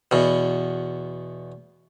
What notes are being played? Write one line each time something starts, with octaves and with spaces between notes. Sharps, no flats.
E2 B2